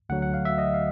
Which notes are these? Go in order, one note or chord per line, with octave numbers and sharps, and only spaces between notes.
D2 D3 F#3 F#5
F#5
F5
E5
D#5
F5